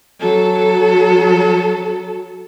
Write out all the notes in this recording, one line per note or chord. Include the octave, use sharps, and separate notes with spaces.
F#3 A4